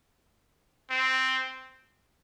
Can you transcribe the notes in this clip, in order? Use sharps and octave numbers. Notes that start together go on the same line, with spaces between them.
C4